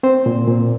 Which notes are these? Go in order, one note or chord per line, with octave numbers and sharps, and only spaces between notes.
C4 C5
A#2
A#2